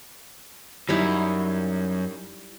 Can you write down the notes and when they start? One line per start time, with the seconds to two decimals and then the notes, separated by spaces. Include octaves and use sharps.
0.89 F#2 G3 D#4 E4